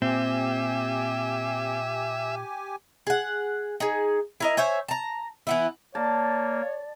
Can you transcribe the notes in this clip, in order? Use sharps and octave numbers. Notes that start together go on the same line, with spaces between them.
A#2 C4 G4 E5 G#5
G#4 F#5
D#4 G#4
E4 A#4 D#5
C5 C#5 E5 G#5
A5 A#5
E3 B3 E4
A#3 C#5 D5 A5